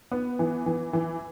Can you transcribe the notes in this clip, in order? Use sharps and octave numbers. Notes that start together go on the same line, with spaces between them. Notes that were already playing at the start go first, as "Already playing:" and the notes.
B3
E3
E3
E3